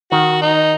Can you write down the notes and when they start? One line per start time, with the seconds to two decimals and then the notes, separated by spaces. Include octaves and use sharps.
0.11 D#3 F#4
0.42 D#4